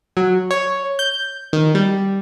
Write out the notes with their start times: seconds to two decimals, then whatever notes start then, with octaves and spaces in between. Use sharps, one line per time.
0.17 F#3
0.51 C#5
0.99 G6
1.53 D#3
1.75 G3